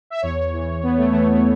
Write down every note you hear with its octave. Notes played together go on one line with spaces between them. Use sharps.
E5
E2 C#5
E3
E2 B3
A3
E3 A3
A3